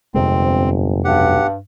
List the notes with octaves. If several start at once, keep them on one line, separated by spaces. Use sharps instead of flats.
G1 F2 C3 G#3 C4
B1 G2 G4 F#5